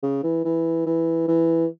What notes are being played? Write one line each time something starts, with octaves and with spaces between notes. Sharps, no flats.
C#3
E3
E3
E3
E3